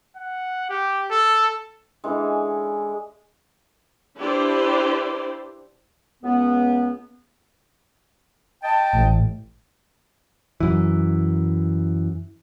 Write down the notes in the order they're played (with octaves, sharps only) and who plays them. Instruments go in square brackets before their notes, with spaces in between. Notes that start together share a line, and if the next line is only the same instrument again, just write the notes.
[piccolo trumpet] F#5
G4
A4
[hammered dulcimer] D3 E3 G#3
[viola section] D4 E4 G4 B4 C5 D5
[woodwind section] C#2 B3
D#5 G5 A5
[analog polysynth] A1
[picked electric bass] F#2 E3